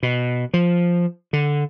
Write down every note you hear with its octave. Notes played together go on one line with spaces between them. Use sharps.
B2
F3
D3